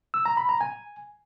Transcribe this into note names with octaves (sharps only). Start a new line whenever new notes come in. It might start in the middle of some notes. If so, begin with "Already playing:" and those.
E6
A#5
B5
A#5
G#5